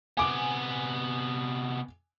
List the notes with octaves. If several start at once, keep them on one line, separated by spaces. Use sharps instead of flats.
C3 B3 G#5 D6